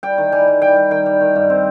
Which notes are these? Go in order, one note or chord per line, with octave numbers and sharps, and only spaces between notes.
G3 G5
D#3
G3 G#5
G3
G3 G5
G3
D#3 G5
G3
D#3
G2
C4